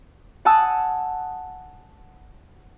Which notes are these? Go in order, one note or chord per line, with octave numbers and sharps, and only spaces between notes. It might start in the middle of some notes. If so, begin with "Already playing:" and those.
F#5 G#5 A5 D#6 E6